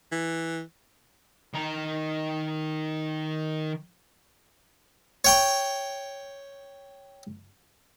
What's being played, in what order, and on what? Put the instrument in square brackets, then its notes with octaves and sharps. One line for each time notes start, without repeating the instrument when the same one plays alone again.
[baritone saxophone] E3
[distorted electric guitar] D#3 A#5
[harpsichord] C#5 G5 C#6